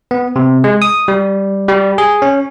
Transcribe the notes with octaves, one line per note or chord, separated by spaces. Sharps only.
B3
C3
G#3
D#6
G3
G3
G#4
C#4